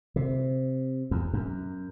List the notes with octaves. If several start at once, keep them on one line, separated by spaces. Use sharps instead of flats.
C3
E2
F#2